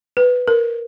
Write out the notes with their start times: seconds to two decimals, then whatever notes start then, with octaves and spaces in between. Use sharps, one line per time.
0.17 B4
0.48 A#4